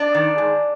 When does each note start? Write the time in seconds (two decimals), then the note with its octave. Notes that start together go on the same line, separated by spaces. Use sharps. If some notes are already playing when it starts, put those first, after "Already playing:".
Already playing: D4 D5
0.15 D#3
0.38 G#2